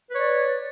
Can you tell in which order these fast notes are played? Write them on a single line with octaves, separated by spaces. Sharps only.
B4 C#5 D5